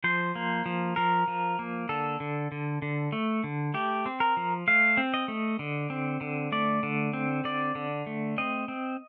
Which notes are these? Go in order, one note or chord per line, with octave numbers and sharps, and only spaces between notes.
F3 C5
A#3
F3
F3 A#4
F3
A#3
D3 A4
D3
D3
D3
A3
D3
A3 G4
C4
A#4
F3
A3 F5
C4
D#5
A3
D3
C4
D3
A3 D5
D3
C4
D3 D5
D3
A3
C4 D#5
C4